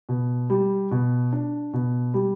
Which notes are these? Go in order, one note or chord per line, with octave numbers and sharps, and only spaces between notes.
B2
G3
B2
D4
B2
G3